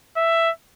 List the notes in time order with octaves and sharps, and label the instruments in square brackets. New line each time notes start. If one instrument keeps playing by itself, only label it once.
[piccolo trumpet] E5